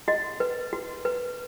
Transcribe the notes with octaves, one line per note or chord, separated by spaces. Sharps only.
F#4 D#5
B4
F#4
B4